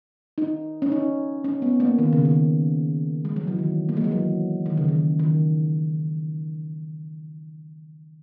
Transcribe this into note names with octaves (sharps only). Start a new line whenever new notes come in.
D#4
C#4
D#4
C#4
B3
A#3
D#3
C#3
D#3
G#3
F#3
E3
D#3
A#3
G#3
F#3
E3
D#3
C#3
D#3
D#3